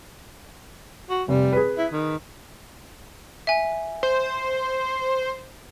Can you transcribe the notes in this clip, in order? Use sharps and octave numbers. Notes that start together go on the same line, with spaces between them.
F#4
F1 G3
G#4 B4
E4
D#3
E5 G#5
C5